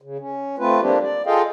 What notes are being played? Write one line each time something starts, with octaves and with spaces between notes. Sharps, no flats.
C#3
C#4
A3 C4 F4 B4
F3 G3 A#3 C4 D4 G4
D5
F4 G#4 A4 D#5 F5 G5